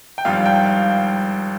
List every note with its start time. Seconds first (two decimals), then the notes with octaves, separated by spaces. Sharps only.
0.18 G5
0.25 G#1 G2 F3 F5
0.46 G5
0.66 F5